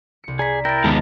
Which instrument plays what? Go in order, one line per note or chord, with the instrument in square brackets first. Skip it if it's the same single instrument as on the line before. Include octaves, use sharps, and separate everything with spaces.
[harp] C2 C#7
[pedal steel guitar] G#4 [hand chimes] D5 A#5 B6
[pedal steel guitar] E4 A#4 G5 [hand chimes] A6 A#6
[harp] D#2 [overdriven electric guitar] G#2 B3 [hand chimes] A5 A#5